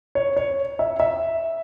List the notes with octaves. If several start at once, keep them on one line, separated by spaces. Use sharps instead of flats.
C#5
C#5
E5
E5